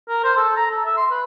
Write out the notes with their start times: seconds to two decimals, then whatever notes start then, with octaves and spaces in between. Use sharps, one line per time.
0.08 A#4
0.24 C5
0.37 A4
0.57 A#5
0.71 A4
0.85 E5
0.97 C6
1.11 B4